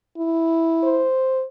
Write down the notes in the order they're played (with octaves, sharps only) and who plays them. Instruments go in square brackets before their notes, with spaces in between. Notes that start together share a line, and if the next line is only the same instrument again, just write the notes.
[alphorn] E4
[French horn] C5